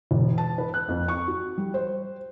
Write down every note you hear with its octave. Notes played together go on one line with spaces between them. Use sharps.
E1
A5
B4
F#6
F2
C#6
F#4
G3
C5